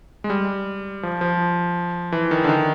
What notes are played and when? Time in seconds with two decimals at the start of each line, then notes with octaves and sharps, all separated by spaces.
0.24 G#3
0.30 G3
1.03 F3
1.21 F3
2.12 E3
2.31 D#3
2.44 D3
2.49 D#3